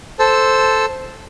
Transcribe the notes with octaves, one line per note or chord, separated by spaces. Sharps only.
A4 C5 A5 E6